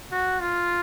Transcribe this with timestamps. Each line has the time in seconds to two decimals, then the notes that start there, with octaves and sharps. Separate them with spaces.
0.12 F#4
0.40 F4